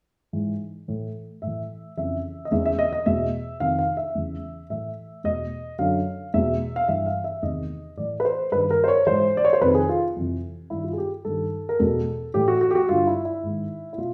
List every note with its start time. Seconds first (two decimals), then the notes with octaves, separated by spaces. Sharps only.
0.33 G#2 E3
0.88 A2 E3
1.42 A2 E3 E5
1.97 F2 C#3 E3 E5
2.45 D#5
2.51 E2 C#3 E3 E5
2.65 E5
2.79 D#5
2.93 D#5
3.06 E2 B2 E5
3.60 F2 C3 D#3 F5
3.79 F5
3.97 E5
4.15 E2 C#3 E3
4.70 A2 E3 E5
5.24 E2 B2 D#5
5.79 F#2 D3 F5
6.34 E2 B2 E5
6.76 F5
6.88 G2 E3 E5
7.06 F5
7.24 E5
7.42 E2 C3 D#3 D#5
7.97 A2 E3 D5
8.20 B4
8.25 C5
8.52 G2 D#3 B4
8.70 A#4
8.84 C5
8.88 C#5
9.07 G#2 E3 C5
9.37 D5
9.45 C#5
9.53 C5
9.61 F2 C3 D#3 B4
9.75 G#4
9.89 F4
10.16 F2 C3 E3
10.70 G2 D#3 E4
10.84 F4
10.93 G#4
10.98 G4
11.25 G2 D#3 A4
11.69 A#4
11.79 E2 B2 A4
12.34 A2 E3 G4
12.48 F#4
12.61 F#4
12.71 G4
12.75 F#4
12.89 G2 D3 F4
13.07 E4
13.25 E4
13.43 G#2 D#3
13.93 E4
13.98 B2 F4